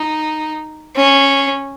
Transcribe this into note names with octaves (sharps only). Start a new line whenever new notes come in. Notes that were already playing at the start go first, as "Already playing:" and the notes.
Already playing: D#4
C#4